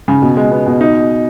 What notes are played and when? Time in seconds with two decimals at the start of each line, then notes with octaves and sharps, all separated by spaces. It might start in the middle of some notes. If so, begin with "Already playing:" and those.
0.08 C#3
0.22 B2
0.37 G#3
0.52 B3
0.66 B2
0.81 D#4